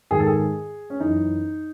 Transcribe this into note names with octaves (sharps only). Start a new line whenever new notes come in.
G#2 D#3 G#4
A4
G#4
C#4
F#2 E3 D#4